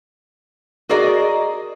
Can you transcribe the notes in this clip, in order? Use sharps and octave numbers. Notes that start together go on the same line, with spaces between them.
F#4 G#4 A#4 D5 D#5